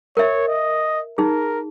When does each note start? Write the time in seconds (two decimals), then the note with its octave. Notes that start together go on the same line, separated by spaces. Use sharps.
0.17 A#4 C#5 E5
0.48 D#5
1.18 D#4 G#4 A#4